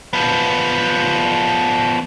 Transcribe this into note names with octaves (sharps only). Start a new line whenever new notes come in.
F3 B3